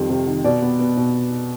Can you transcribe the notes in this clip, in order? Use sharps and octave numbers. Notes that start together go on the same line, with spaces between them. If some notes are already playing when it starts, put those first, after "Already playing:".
Already playing: F2 D#3 G3
C3
D#3
B2 D5
B3
B3
B2